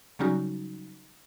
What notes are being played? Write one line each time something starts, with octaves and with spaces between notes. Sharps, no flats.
C#3 F#3 G3 C#4 D#4 F#4